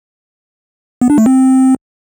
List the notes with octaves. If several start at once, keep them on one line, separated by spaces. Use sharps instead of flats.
B3
D4
A3
C4